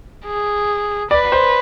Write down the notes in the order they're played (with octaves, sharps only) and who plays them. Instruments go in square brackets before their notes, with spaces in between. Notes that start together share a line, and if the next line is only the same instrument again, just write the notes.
[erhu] G#4
[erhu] B4 [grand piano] D5
[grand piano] C5